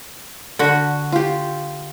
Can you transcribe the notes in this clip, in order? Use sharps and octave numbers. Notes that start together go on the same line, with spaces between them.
D3 F#4
F4 G4